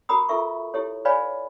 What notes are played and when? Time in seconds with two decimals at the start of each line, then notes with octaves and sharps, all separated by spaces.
0.09 F#4 G#4 A#4 A#5 B5 D#6
0.29 F4 A4 A#4 E5 C#6
0.74 E4 G4 A4 C#5
1.05 B4 C#5 D5 F5 G#5 B5